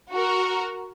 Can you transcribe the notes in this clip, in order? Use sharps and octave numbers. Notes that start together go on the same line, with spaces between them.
F#4 A#4